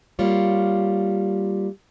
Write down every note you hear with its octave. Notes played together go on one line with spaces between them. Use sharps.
G3 A#3 F4 C#5